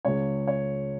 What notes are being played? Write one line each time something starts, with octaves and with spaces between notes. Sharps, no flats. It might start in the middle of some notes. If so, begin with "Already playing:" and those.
C#2 C#3 G#3 C#5
C#5